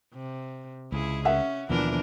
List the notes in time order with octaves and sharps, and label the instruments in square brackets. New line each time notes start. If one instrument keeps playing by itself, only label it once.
[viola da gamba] C3
[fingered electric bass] C#2 [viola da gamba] E4 G#4
[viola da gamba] C#4 [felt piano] E5 F#5
[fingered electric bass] D#2 B2 F3 [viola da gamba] E3 D4 A#4